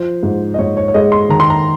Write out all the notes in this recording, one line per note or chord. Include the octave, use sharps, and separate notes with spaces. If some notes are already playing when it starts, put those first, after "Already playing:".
Already playing: F3 C5
G#2
D#5
G#2 C#5
C#5
C#5
G#3 D#5
C6
D#3 A#5
C6
A#5